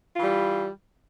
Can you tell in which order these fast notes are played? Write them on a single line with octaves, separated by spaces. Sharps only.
F4 E3 G3